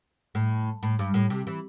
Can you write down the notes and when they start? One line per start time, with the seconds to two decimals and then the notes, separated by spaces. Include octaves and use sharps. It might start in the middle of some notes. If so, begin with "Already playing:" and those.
0.35 A2
0.83 A2
0.99 G2
1.14 A2
1.30 C3
1.47 E3